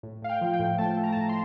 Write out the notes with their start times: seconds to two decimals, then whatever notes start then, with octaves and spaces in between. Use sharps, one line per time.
0.03 A2
0.22 A2 F5
0.29 G5
0.41 F3
0.53 G5
0.60 A2
0.78 A3 A5
0.97 A3
1.04 A#5
1.12 A5
1.16 A2 A#5
1.29 C6